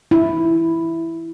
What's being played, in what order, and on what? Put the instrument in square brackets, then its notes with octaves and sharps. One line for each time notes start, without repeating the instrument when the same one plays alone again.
[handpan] E4